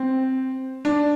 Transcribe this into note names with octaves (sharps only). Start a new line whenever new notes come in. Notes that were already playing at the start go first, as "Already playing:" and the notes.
Already playing: C4
D4